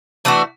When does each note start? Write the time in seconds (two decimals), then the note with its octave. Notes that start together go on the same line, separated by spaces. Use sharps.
0.25 E3 A3 D4 F#4